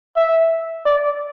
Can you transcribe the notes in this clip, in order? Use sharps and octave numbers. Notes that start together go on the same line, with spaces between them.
E5
D5